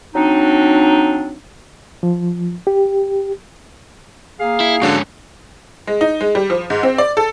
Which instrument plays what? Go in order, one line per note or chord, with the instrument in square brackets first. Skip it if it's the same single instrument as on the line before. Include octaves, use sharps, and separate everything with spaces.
[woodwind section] F#3 C4 D4 D#4
[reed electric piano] F3
G4
[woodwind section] A#3 G#4 F5
[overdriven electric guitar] E4
[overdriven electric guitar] G#2 C#4 [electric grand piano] D3 D4 F#4
[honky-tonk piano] G#3
D#4
G#3
G3
F3
G#2
C4
D5
A4